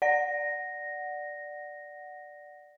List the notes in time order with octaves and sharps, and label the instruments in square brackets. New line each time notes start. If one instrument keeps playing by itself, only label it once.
[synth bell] D5 F#5 A#6